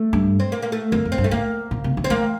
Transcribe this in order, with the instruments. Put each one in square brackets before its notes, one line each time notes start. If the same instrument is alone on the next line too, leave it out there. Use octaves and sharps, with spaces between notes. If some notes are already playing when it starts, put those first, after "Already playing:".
Already playing: [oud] A3
[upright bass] G2
[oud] C4
A#3
A#3
A3
[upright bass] F2 [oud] A#3
[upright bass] F2
[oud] C4
[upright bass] G2
[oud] A3
[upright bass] A2 [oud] A#3
[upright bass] A#2
C3
E3
[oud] C4
[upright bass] E3 [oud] A#3